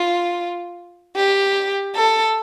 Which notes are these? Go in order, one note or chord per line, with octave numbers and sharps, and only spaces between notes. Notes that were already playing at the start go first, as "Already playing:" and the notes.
Already playing: F4
G4
A4